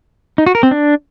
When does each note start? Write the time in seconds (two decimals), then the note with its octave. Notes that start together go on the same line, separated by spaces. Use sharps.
0.38 D#4
0.46 F#4
0.55 A#4
0.63 C4
0.71 D4